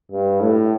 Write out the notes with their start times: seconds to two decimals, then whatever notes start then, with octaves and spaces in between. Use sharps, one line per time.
0.11 G2
0.40 A2